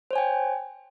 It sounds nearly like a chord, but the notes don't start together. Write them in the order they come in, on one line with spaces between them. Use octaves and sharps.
C5 C#5 G#5 G5